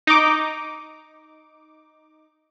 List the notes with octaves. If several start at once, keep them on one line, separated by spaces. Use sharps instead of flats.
D#4 D6